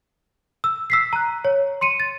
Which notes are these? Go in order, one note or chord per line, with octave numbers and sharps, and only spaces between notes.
E6
E6 B6 C7
A#5 F#6
C#5
C6 C#7 D#7
A6